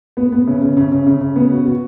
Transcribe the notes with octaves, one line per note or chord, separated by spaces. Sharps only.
B3
B3
C#3
C#3
C#3
C#3
C#3
C#3
B3
F#4
F#4